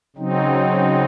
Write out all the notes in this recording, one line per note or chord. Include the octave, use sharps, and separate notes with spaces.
C#3 F#3 C4 D#4